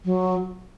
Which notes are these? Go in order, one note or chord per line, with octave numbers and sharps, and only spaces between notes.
F#3